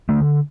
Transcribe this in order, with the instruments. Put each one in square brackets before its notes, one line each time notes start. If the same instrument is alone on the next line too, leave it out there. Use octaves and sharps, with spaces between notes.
[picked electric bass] D3 A3